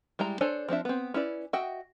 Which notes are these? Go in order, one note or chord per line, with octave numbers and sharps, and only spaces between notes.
G3 G#3 E4 A#5
D4 A4 C5 C#5 G#5
F3 C4 D4 E5
B3 C4
C#4 E4 B4 D5
F#4 D#5 E5 G5